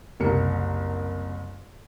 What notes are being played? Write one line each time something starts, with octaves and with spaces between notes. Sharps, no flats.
F#1 C2 A#4 C#7